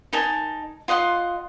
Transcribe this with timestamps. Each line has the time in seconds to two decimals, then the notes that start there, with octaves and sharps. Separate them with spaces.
0.13 D#4 A#4 G#5 A5
0.88 F4 D#5 F#5 C6